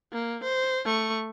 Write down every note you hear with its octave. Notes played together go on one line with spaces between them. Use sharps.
A#3
C5
A3 C#6